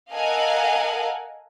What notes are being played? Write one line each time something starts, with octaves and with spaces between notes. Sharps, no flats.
A4 A#4 D#5 F5 F#5 G#5